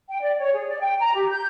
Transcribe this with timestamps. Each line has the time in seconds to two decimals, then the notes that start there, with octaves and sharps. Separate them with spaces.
0.09 G5
0.22 D5
0.39 C#5
0.54 G#4
0.68 D5
0.80 G5
0.99 A#5
1.15 G4
1.29 G6